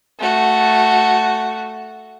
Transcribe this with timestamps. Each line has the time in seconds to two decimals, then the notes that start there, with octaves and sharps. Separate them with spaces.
0.19 A3 F#4